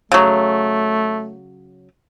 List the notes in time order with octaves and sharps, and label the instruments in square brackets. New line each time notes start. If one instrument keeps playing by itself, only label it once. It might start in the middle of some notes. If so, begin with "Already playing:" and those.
[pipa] C#3 F#3 [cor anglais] A3